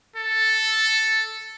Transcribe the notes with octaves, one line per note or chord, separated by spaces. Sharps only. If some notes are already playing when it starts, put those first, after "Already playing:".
A4